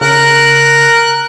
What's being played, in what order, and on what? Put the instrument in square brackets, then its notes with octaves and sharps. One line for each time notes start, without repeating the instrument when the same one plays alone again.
[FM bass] C#3 [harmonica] A#4 [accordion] F#6